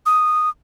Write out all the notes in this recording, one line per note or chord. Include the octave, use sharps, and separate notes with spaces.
D#6